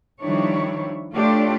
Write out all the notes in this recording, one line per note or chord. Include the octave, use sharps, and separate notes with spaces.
D#3 F3 G3 D4 E4 C#5
A3 D4 F4 G4 A4 C#5